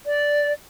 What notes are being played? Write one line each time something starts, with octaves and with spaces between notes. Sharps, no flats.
D5